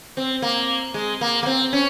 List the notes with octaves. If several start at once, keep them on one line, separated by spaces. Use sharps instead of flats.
C4
A#3
G#3
A#3
A#3
C4
C#4